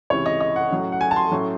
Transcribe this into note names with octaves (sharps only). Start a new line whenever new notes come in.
C#2 C3 E3 C#5
D#5
D#5
F#5
A2 F#3 C#4
F#5
G#5
A5
C6
A2 F#3 A3 C#4